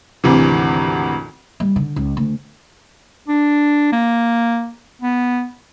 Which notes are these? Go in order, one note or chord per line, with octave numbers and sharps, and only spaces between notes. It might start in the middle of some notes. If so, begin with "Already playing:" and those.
G#1 D2 C3 E3
G3
D3
C#2
D2
D4
A#3
B3